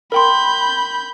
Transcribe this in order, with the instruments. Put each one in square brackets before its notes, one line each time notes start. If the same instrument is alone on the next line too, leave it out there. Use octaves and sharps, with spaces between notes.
[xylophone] A#4 G5 C6 [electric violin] B5 G6